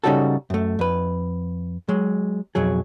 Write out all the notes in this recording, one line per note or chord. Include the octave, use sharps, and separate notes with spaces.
C#3 F3 G3 D#4 F#4 A4
F#2 A3
F2 B4
F#3 G#3
B1 F2 F#3 G#4